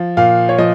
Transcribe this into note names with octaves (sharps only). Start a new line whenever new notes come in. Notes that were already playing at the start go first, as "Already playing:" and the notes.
Already playing: F3
A#2 F5
C#5
F3 D#5